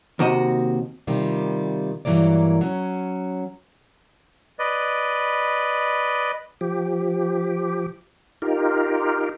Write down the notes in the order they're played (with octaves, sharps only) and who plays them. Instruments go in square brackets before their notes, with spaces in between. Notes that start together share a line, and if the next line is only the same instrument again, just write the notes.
[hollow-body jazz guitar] D#2 C3 F#4 D#5
[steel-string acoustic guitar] C3 D#3 G3 F4
G2 A#2 E3 F#3 A#3 D5
F#3 C#4
[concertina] B4 D5 D#5
[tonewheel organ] F3 G4
D#4 F4 G4 A#4